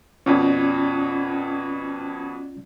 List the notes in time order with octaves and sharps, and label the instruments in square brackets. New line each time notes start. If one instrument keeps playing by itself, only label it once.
[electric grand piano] F2 B2 [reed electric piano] C#4 F4 D5